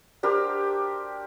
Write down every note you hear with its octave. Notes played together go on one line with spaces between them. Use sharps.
D4 G4 A#4 C5